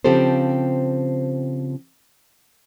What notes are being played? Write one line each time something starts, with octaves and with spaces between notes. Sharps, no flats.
C#3 F3 C4 G4 A4 C5